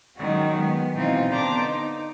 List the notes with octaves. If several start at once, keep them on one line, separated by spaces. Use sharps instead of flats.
D#3 F#3 G#3 C#4 F#4
G#3 B3
B2 E3 C4 D#4 F4
D3 B3 D4 C5 A#5 D6
D#4